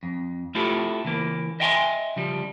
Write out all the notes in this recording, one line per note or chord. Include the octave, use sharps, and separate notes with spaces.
F2
A3 E4 F4 G4 A4
C#3 E3 A#3
D#5 E5 G5 G#5 A#5 C6
C#3 F3 G3